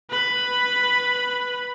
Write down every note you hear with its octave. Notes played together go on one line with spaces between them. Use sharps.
B4 B5